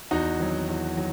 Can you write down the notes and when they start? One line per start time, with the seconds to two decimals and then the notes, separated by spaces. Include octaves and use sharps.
0.11 E2 D#4 F#4
0.40 D#3 F#3
0.69 E2
0.97 D#3 F#3